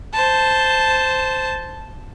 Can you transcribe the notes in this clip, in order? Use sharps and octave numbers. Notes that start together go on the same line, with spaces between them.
C5 A5